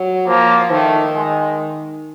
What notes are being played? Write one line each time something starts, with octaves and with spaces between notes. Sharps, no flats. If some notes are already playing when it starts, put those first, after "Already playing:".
Already playing: F#3
F3 A#3
D#3 A3
G#3